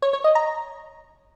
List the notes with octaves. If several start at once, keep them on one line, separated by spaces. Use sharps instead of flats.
C#5
C#5
D#5
A#5